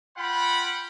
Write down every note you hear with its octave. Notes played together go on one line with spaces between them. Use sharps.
F4 F#5 G5 B5